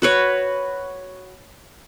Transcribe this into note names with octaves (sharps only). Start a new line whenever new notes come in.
F#4 B4 C#5